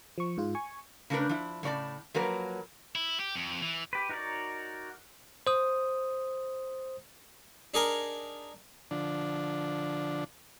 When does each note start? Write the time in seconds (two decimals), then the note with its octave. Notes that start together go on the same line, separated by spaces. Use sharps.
0.18 F3 C#6
0.38 G#2 F4
0.55 G#5 C#6
1.10 C#3 A3 D4 F#4 A#4 B4
1.29 F3 E4
1.63 A2 C#3 C#5 D5 A5
2.14 F3 F#3 A#3 A#4 B4
2.95 E4
3.20 G4
3.35 F2
3.62 E3
3.93 G4 B4
4.09 D#4 F#4 A#4 C#5 D5
5.47 C5 D#6
7.74 D4 D#4 G#4 A#4 G#5 A#5
8.91 D3 F3 D4